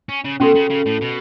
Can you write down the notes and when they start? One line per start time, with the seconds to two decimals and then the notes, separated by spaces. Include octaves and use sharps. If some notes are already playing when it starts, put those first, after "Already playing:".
0.09 C#4
0.25 C#3
0.40 B2 C#4 F#4 A4
0.55 C#3
0.70 C#3
0.86 A2
1.01 B2